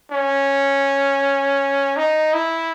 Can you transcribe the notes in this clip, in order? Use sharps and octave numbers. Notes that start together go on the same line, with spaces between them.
C#4
D#4
E4